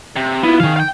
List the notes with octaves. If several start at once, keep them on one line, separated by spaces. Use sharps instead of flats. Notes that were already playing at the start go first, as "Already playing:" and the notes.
C3
B3 E4 F4
D#3 E3 G#4 F5
F5 G5